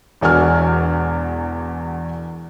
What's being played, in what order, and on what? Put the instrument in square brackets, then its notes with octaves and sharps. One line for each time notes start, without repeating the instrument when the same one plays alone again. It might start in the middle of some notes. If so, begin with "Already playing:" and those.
[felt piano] E1 E2 D4 F#4 G#5 F6